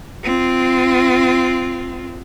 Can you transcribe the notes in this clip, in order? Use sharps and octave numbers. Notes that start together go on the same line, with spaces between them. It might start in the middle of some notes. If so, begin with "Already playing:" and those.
C4 F4